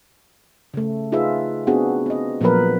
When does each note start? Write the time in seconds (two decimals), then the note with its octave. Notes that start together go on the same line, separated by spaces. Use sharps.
0.74 C#3 A3
1.12 D#4 F4 G#4 B4 E5
1.67 B3 C4 D4 F#4 G#4
2.06 C4 D#5
2.41 A#2 F3 F#3 B3 A#4 B4